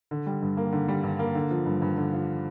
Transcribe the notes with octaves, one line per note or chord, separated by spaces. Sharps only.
D3
G3
G2
A#3
D3
G3
G2
A#3
D3
F3
G2
G2
D3
F3